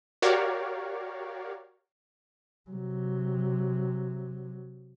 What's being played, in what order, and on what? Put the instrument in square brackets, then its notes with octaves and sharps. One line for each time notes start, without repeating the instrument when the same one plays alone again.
[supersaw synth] F#4 G4 A#4 C#5 D5 F5
[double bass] C3 F#3